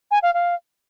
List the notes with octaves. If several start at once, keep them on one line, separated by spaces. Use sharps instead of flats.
G#5
F5
F5